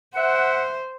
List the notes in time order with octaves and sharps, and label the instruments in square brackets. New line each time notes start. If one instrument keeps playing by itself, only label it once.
[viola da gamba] C5 [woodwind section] E5 F#5